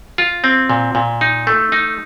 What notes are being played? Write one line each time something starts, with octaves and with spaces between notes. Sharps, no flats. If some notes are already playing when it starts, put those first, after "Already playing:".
F4
C4
A#2
A#2
D#4
A3
D#4